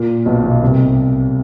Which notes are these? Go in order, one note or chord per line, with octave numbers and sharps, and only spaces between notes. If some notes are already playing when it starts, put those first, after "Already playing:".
Already playing: A#2
B1 B2
B1 B2
C2 C3